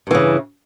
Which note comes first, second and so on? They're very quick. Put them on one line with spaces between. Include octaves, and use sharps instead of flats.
G2 E3 C#3